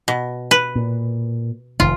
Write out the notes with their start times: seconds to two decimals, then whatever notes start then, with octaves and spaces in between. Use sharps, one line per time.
0.08 B2
0.51 B4
0.76 A#2
1.80 F1 D#3 F4